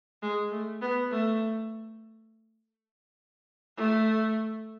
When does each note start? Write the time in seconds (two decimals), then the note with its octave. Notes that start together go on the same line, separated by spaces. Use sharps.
0.23 G#3
0.52 A3
0.82 B3
1.11 A3
3.77 A3